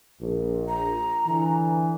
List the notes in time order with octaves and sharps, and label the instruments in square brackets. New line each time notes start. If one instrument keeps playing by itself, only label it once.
[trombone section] A#1
[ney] A#5
[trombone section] D3 E3